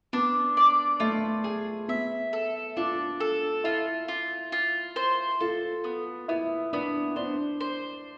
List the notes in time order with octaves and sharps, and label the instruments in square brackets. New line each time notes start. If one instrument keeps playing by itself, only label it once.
[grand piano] B3 [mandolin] D4
[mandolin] D5
[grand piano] A3 [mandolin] F4
[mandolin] G#4
[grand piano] B3 [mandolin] E5
[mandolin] A4
[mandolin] D4 [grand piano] F4
[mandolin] A4
[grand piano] E4 [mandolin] F4
[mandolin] F4
F4
C5
[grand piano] F4 [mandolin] A4
[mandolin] B3
[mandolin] B3 [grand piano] E4
[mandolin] B3 [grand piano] D4
[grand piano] D4 [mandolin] C5
[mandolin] C5